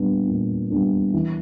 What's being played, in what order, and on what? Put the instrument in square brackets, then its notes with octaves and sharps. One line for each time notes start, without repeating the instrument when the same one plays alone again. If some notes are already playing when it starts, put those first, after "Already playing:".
Already playing: [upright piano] A#2 G3 B3 D4
A#2
G3 B3 D4
E3